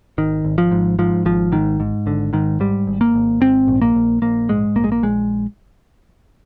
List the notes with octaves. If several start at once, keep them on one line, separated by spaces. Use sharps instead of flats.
G#1 D#3
G#1
F3
G#2
G#2 F3
G#1 F3
G#2 D#3
G#2
G#1 D3
G#2 D#3
G#2 G3
G#1
A#3
G#1
G#2 C4
A#1
A#3
A#1
A#1 A#3
G#2 G#3
A#1 A#3
G#3
A#3
A#1 G#3